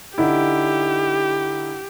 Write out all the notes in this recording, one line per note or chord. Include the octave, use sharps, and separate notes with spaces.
D3 D#4 E4 G4